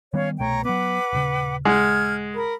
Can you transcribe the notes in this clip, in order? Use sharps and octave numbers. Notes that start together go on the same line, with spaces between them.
D#3 G3 B3 C#4 C#5 F5
C2 B2 A3 C#5 G5 A#5
F#3 B3 B4 F#5 D6
D#1 C#3
G#3 F#5 F6 G#6
A#4 B5